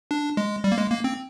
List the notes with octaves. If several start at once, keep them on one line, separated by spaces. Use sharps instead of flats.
D4
G#3
G3
A#3
G#3
A#3
C4